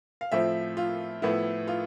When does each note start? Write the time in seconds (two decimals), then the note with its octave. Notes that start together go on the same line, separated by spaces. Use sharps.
0.21 F5
0.32 A2 F3 C4 E5
0.77 F4
1.22 A2 F3 B3 E4
1.68 F4